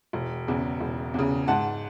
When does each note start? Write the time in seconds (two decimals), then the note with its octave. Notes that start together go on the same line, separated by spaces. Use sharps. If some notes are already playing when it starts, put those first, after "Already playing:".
0.13 E1
0.47 E2 C#3
0.80 E1
1.14 E2 C#3
1.48 G#2 F#5 A5